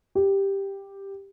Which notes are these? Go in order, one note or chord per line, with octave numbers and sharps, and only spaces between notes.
G4